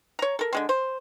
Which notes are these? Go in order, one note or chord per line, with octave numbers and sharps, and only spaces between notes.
C#5 A#5
A4 A#4
D3 G#3 C4
C5